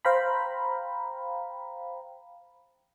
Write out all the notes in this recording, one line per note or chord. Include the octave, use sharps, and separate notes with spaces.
C5 F5 G5 A#5 B5